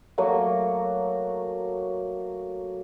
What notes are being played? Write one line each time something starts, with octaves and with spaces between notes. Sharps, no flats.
F#3 A3 A#3 F#4